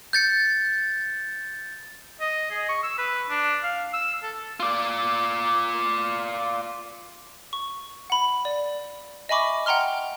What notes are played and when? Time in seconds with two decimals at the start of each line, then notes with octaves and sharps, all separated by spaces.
0.13 G6 A6 C#7
2.21 D#5
2.51 G#4
2.69 C#6
2.83 E6
2.98 B4
3.30 D4
3.63 F5
3.94 E6
4.23 A4
4.60 F4 D5
7.53 C#6
8.10 F#5 B5
8.45 D5
9.29 D#5 E5 G#5 B5 C#6 D6
9.66 F#5 G5 A#5 C6 F6